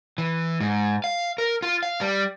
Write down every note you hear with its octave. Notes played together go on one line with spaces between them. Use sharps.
E3
G#2
F5
A#4
F4
F5
G3